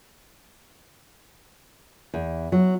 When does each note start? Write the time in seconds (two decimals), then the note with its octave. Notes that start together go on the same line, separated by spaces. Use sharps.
2.14 E2
2.52 F#3